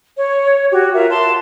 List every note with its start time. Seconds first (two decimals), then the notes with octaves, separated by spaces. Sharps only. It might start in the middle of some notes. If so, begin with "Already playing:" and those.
0.18 C#5
0.71 F#4 G4
0.94 F4 A#4 E5
1.10 A5 C6